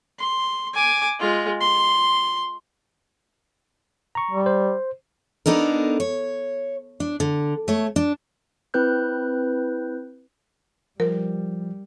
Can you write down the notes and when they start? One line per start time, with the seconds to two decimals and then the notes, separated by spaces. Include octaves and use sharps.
0.19 C6
0.74 G#5 D6
1.20 G#3 F4
1.61 C6
4.15 A#5 C#6
4.31 G3
4.46 C5
5.46 B3 D4 D#4 A4 A#4
6.00 C#5
7.00 D4
7.20 D3
7.68 A3 C#5
7.96 D4
8.74 C4 E4 B4 F#6 G6
11.00 F3 G3 A#4